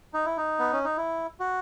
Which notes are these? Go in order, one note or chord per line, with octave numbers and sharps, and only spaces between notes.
D#4
E4
D#4
B3
C#4
D#4
E4
F#4